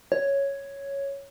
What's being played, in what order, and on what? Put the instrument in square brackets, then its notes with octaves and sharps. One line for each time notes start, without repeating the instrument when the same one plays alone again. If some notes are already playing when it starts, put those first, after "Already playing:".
[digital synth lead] C#5